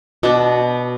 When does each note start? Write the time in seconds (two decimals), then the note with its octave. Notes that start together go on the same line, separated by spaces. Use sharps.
0.23 B2 B3 D4